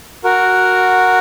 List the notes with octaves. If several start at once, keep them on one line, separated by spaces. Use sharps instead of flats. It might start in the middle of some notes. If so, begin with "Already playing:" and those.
F#4 A#4